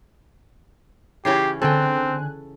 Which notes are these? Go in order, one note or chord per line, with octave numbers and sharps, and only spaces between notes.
C#3 E3 C#4 G4 C7
D3 C4 A4 G5 G#5 F#6